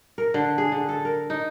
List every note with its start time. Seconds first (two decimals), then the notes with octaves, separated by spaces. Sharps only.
0.18 A#4
0.34 D3
0.58 G#4
0.72 D3
0.89 A4
1.05 A#4
1.30 D#4